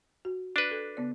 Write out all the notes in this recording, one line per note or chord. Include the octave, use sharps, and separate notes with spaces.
F#4
D4 B4
A4
C#3 B3 D5